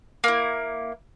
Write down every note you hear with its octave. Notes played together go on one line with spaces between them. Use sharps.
A#3 E4